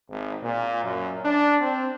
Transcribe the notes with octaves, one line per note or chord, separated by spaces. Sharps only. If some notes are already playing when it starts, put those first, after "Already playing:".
G#1
A#2
F#2
D4
C4